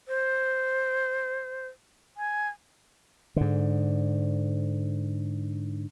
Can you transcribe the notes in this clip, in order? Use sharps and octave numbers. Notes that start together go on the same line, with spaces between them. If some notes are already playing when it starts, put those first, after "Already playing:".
C5
G#5
G#2 D3